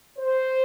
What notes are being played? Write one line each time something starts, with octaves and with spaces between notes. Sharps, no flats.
C5